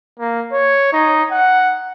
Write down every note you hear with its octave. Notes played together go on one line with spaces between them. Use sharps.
A#3
C#5
D#4
F#5